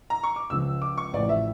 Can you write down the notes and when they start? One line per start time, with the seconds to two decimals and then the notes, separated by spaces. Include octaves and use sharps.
0.10 A#5
0.23 C#6
0.36 D6
0.50 C#2 C#3 F3 E6
0.82 D6
0.98 C#6
1.13 A1 A2 F3 D5
1.29 E5